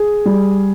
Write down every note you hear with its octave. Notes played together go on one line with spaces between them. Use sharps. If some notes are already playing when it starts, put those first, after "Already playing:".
Already playing: G#4
G3